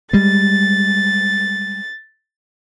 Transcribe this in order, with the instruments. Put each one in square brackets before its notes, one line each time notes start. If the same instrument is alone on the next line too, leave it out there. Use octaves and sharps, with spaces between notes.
[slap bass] G3 G#3 [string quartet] A6